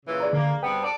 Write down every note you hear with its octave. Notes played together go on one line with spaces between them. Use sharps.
A#2 C#3 E3
G#4 D5 A#5
D3 A#3
G2 B3 C4 G5
A4 D5 A5